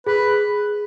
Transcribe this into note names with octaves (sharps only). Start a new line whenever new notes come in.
G#4 B4